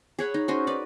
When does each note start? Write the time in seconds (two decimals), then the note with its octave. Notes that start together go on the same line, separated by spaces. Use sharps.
0.19 G#4 C#5 F#5 B5
0.34 D#4
0.48 C#4 F#4 C5 D#5
0.67 D#4 B4 D5